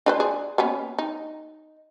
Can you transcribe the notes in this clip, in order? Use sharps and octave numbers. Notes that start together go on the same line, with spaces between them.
D4 B4 C5
G#4 D5
A#3 B3 C#4
D#4